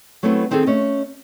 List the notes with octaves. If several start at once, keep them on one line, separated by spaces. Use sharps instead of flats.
F#3 A3 B3 C4 E4 B4
D#3 C4 D#4 G#4 A4
A3 C#4 D#5